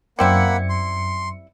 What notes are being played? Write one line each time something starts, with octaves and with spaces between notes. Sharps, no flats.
F#2 G3 A#3 C4 E4 F#5 B5 C#7
C6